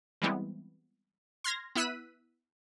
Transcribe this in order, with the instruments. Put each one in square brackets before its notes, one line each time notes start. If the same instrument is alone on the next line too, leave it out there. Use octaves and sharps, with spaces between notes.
[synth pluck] E3 G3 G#3 B3 C4 E4
C6 F6 G#6 A#6
B3 E4 E6 F#6 B6 D#7